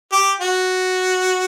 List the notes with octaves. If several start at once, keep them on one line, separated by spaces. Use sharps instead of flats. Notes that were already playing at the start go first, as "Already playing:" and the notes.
G4
F#4